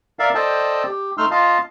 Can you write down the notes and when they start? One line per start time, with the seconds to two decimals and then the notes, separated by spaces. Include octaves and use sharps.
0.19 A#4 D5 E5 F5
0.35 A4 C5 D5 D#5 G5 A5
0.86 G4
1.18 A3 D#4 C6 E6 F6
1.31 F4 D#5 F5 A5